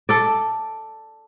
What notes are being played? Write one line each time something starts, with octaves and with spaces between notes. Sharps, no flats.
A4 D5